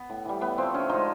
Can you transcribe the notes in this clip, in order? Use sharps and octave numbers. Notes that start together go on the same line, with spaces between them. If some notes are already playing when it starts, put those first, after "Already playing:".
Already playing: B3
A2
E3 G3
A2 B3
F3 A3 C4
D3 C#4
F3 G#3 D#4